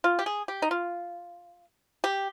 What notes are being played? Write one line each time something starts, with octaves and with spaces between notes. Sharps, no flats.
F4
G4
G#4
G4
D#4
F4
G4